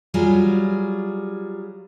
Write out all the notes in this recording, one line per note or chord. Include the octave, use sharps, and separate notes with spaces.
F#3 G3 F4 G#4